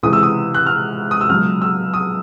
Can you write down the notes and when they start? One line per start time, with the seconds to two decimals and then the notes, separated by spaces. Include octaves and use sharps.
0.03 C#2 C3 E3 G#3 D#6
0.13 E6
0.23 D#6
0.54 F#6
0.66 F6
1.11 D#6
1.21 E6
1.29 C#2 B2 F#3 F6
1.62 E6
1.94 D#6